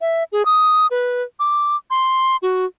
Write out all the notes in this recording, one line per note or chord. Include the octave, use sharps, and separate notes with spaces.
E5
G#4
D#6
B4
D6
C6
F#4